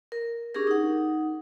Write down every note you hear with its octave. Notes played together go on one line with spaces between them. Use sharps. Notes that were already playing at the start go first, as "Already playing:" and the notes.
A#4
C#4 D4 G4 G#4 A#4
D#4 F#5